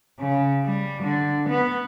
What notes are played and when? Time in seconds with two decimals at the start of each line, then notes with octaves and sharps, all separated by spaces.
0.19 C#3
0.65 G3
1.03 D3
1.49 B3